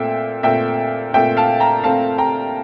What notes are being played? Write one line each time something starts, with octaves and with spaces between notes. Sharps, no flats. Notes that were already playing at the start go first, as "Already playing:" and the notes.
Already playing: A#2 A3 C4 E5 G5
A#2 A3 C4 E5 G5
A#2 A3 C4 E5 G5
F5 A5
G5 A#5
A#2 A3 C4 F5 A5
G5 A#5